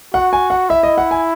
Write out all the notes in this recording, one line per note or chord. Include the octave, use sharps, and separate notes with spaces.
F#4 F#5
G#5
F#5
E4 E5
D#5
F#5
G#5